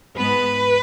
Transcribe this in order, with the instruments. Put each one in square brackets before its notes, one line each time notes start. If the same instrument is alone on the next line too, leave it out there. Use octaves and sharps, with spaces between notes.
[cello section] G#2 G#3 B3 B4